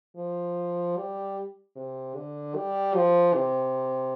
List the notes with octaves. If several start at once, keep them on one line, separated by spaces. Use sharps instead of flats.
F3
G3
C3
D3
G3
F3
C3